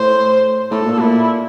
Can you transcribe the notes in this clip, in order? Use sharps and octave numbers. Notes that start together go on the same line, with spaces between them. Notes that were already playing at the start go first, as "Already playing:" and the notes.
Already playing: A2 C5
A2 A4
A2
A#2
A#2 E4